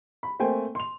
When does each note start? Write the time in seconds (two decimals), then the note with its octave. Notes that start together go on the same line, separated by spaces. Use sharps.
0.23 B5
0.40 A3 A#3 C4 C5 G5 G#5
0.75 C6 F7